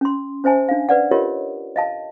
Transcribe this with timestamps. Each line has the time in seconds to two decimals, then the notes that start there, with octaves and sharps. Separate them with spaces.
0.01 C#4 C6
0.44 C#4 C5 E5 G#5 A5
0.69 D4 F5
0.89 B4 D5 F#5
1.11 F4 G4 A#4 C#5 D#5
1.76 D#5 F5 A5